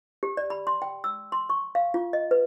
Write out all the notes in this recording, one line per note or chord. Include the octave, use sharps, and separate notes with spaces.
G4
D5
B5
C6
G5
E6
C6
C#6
F5
F4
D#5
B4